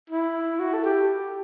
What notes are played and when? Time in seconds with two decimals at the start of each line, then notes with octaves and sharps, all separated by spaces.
0.10 E4
0.59 F#4
0.74 A4
0.84 G4